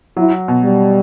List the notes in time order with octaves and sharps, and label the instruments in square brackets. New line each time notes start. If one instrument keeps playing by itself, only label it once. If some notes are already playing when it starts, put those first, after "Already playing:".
[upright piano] F#3 [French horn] E4
[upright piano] B2
[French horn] G3